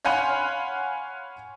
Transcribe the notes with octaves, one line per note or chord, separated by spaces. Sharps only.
C#5 F5 F#5 G#5 B5 C6